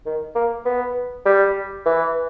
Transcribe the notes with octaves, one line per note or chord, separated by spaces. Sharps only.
D#3
A#3
B3
G3
E3